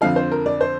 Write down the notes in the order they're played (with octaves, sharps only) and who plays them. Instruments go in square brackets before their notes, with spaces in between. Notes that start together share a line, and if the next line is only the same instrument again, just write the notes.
[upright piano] F2 D3 F3 F5
C5
A#4
D5
C5